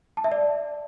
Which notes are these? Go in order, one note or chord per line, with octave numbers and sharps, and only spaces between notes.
A5
E5
D5